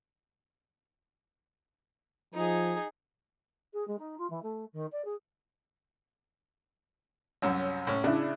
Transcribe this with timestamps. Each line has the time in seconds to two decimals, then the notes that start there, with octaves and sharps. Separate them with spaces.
2.34 F3 D#4 G#4
3.73 G#4
3.87 G#3
3.98 D#4
4.18 F4
4.30 E3
4.42 A3
4.73 D#3
4.92 D5
5.04 G#4
7.42 C2 F#2 C#5 E6
7.87 A2 C#4
8.04 C#3 D4 E4